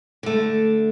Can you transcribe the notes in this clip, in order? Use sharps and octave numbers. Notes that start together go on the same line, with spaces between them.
D3 A3